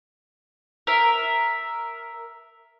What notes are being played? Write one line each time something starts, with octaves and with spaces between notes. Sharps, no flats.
A#4 E5